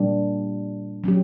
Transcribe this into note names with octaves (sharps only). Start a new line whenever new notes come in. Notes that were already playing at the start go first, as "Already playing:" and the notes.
Already playing: A#2 G3 A#3 D4 G4
F#3 C#4 G4